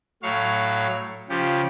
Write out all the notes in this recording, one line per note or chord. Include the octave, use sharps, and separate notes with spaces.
A2 F#3 C#5 F5
C#3 F3 G4